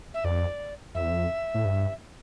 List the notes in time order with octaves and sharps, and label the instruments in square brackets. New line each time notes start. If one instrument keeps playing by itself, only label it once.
[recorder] E5
[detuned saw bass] F2 [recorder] D5
[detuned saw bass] F2 [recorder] E5
[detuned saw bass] E2
F2
A2
G2